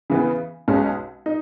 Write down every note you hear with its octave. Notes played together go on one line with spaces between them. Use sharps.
C#3 E3 B3
B1 B2 G#3 C#4
D#4